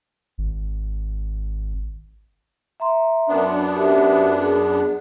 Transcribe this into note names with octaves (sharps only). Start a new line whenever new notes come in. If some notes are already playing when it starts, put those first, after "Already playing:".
G#1
E5 A#5 C6
F#2 B3 D4
G4 E5
G#4